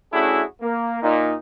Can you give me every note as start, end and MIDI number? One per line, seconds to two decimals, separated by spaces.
0.13 0.43 57
0.13 0.43 61
0.13 0.43 62
0.13 0.43 64
0.13 0.43 66
0.13 0.43 68
0.61 1.01 58
1.02 1.34 46
1.02 1.34 63